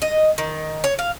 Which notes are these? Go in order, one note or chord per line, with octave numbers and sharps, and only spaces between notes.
D#5
D#3
C#5
F5